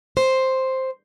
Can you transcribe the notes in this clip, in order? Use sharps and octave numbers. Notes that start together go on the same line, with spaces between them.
C5